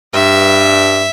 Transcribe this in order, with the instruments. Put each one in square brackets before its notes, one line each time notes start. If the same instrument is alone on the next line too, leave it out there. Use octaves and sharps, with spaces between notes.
[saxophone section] G2 [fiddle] E5